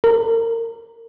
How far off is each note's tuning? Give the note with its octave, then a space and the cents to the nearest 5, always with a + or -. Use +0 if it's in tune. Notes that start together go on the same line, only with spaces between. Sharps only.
A#4 -30